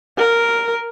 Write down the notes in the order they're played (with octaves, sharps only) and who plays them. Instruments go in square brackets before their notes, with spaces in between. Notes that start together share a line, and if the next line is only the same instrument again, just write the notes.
[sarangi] A#4